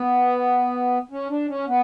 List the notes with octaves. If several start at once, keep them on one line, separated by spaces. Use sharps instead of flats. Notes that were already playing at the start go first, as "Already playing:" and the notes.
Already playing: B3
C#4
D4
C#4
B3